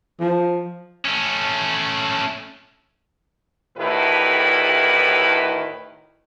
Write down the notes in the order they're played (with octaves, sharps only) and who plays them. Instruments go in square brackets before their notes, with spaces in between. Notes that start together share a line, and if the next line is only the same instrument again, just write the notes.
[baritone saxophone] F3
[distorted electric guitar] A3 C#4
[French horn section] D2 A2 D#3 E4 G4 B4